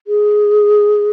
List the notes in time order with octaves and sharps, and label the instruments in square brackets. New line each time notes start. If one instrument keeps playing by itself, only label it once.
[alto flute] G#4